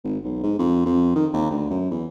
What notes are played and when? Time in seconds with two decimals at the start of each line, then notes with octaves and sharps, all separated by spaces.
0.04 G#1
0.24 B1
0.43 G#2
0.59 F2
0.86 F2
1.16 D#3
1.34 D#2
1.51 D2
1.70 F#2
1.91 E2